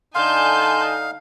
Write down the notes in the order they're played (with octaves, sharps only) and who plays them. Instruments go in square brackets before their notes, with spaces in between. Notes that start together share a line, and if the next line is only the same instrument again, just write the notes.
[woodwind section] D3 D#4 [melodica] F5 [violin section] G#5 A5 G6 [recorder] C6